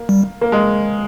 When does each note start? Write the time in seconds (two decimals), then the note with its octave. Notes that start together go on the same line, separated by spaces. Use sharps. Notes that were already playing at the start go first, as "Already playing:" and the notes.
Already playing: A#3
0.09 G3
0.41 A#3
0.52 G#3